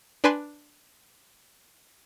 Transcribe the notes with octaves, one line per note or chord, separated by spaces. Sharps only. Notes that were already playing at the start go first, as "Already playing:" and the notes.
D4 B4 G#5 C6